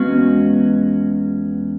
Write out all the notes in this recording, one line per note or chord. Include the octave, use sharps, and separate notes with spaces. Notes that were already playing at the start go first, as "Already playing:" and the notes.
Already playing: E2 G#3 B3 C#4 F#4